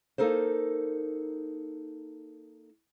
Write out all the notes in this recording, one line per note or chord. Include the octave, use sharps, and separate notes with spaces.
A#3 D#4 A4 A#4 C5